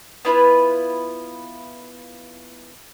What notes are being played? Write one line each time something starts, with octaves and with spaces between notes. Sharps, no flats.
B3 E4 F4 B4